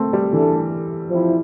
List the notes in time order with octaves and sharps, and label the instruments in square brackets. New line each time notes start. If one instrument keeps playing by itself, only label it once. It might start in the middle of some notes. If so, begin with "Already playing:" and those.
Already playing: [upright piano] A3 C4
G3
[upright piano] E3 [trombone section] A3 D4 A4
[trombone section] F3 C4 E4